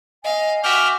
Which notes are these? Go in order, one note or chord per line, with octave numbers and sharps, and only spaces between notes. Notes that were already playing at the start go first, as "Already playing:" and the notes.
D#5 F5 G#5
F#4 E5 G5 D6 F6